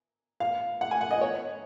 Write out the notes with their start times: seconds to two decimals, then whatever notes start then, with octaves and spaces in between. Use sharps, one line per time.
0.40 F5
0.81 F#5
0.91 G#5
1.01 F#5
1.11 D#5
1.21 C#5